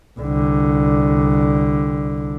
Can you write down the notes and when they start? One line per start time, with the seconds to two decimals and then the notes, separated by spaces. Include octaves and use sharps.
0.20 C2 D3